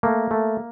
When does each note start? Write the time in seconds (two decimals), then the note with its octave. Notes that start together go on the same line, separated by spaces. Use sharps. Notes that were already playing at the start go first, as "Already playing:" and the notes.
0.03 A3 A#3
0.31 A3